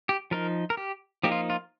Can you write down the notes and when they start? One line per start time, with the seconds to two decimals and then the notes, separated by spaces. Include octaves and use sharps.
0.09 G4
0.31 F3 D#4 A#4
0.70 A#4
0.77 G4
1.23 F3 A#3 D#4 G4
1.32 F4
1.50 F4